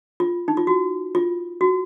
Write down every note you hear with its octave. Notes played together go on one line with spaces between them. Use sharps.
F4
D#4
F4
F#4
F4
F#4